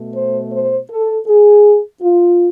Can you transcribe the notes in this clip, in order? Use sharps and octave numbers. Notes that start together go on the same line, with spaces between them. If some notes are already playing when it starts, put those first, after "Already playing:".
Already playing: B2 A3
C5
C5
A4
G#4
F4